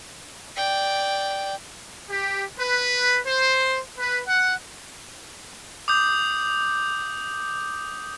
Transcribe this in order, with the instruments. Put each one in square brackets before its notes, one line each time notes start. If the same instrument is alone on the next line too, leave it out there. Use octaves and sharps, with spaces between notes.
[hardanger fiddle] D5 G5
[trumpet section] G4
B4
C5
B4
F#5
[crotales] D6 D#6 G6